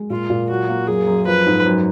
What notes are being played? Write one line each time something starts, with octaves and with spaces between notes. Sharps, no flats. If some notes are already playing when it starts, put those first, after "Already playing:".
Already playing: G#3
A#2 F4
A#2
F#3 F#4
A#3
F#2 G#4
F#2
F3 B4
G#2
F#2